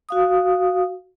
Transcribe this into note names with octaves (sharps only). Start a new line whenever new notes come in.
F#4 F5 D#6